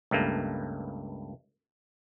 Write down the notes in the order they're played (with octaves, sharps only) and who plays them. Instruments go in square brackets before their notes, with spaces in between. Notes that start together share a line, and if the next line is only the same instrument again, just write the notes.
[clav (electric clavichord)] C#2 G2 A3 A#3